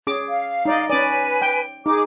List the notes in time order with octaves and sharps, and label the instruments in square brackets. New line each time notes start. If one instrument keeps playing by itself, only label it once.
[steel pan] C#4 G#4 D6
[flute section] F5
[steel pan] D#4 D5 D#5
[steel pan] C#4 D5 [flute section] B4 G#5
[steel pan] G5
[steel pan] D#4 [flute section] G#4 D6